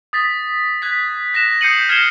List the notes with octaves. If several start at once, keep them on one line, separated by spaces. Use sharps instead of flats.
D#6 A6 B6
F#6 G#6 B6
F#6 A#6 B6 E7
D#6 G6 C7 C#7 D#7 F#7
F6 G#6 A#6 C7 E7 G7